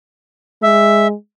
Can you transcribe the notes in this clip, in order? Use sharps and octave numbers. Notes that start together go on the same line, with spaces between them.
G#3 E5